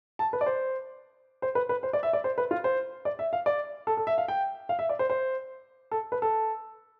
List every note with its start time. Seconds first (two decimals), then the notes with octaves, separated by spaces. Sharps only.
0.19 A5
0.33 B4
0.41 D5
0.46 C5
1.42 C5
1.55 B4
1.69 B4
1.83 C5
1.93 D5
2.03 E5
2.13 D5
2.24 C5
2.38 B4
2.51 F4
2.64 C5
3.05 D5
3.19 E5
3.33 F5
3.46 D5
3.87 A4
3.97 A4
4.07 E5
4.18 F5
4.28 G5
4.69 F5
4.79 E5
4.89 D5
4.99 C5
5.10 C5
5.91 A4
6.12 B4
6.22 A4